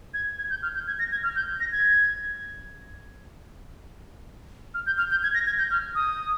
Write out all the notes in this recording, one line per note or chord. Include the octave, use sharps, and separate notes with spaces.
G#6
G#6
G6
F6
G6
G#6
A#6
G#6
F6
G6
A#6
G#6
F6
G6
F6
G6
G#6
A#6
G#6
G6
F6
D#6